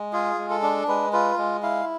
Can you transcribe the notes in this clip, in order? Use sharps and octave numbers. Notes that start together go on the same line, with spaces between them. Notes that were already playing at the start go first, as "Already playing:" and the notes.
Already playing: G#3
F4 G#4
G#3
A4
D4
G#3 B4
F4 B4
G#3
E4 F5